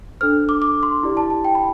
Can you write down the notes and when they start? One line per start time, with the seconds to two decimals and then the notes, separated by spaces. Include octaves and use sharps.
0.21 D4 A4 C5 F6
0.49 D6
0.62 D6
0.83 C6
1.03 E4 G4 D5
1.17 A5
1.30 A5
1.45 G5
1.55 B5